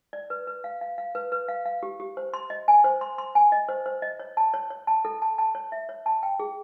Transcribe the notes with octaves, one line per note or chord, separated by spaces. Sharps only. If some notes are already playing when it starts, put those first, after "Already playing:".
D5
B4
B4
F5
F5
F5
B4
B4
F5
F5
G4
G4
C5
C6
D#5
G#5
C5
C6
C6
G#5
D#5
C5
C5
D#5
C#5
A5
C#5
C#5
A5
A4
A5
A5
C#5
E5
C#5
A5
G5
G#4